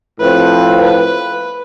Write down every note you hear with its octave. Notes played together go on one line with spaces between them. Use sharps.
A2 F3 C4 F4 B4
B4